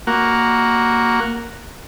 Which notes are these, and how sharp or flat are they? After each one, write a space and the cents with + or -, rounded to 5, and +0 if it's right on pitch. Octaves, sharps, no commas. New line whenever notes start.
A#3 +0 F#4 +0